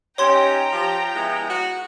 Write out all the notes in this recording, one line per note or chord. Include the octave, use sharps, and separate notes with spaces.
C#4 D#4 G4 C#5 G5 A#5 C6 G#6
F3 G4
G#3 B3 E4
F#4